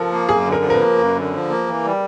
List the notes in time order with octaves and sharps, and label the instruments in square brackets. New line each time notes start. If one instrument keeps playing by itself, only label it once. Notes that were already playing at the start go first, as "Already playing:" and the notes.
Already playing: [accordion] F3 [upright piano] A4 A#4
[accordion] A#3
[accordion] F#2 [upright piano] G#4
[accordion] D3
[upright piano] A#4
[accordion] F3
[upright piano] A#4
B4
[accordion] A#3
F#2
D3
F3
A#3
E3
G3